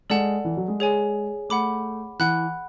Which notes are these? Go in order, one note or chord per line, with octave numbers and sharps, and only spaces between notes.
G#3 A4 D5 F#5 A5
E3
F#3
G#3
G#4 C#5 G#5
A3 F#5 B5 D6
E3 F#5 B5 F#6